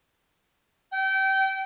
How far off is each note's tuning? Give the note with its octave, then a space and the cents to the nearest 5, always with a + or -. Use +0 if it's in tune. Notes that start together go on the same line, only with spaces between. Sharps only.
G5 -30